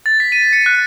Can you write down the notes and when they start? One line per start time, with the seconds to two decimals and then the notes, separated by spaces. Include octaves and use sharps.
0.06 A6
0.20 B6
0.32 D#7
0.53 C#7
0.66 F#6